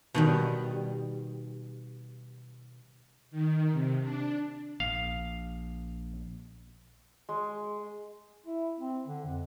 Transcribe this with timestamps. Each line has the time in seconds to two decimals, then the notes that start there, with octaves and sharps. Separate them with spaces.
0.14 B2 D#3 G3
3.31 D#3
3.72 C3
4.03 D4
4.80 A#1 F5
7.29 G#3
8.45 E4
8.80 C4
9.06 D3
9.26 F2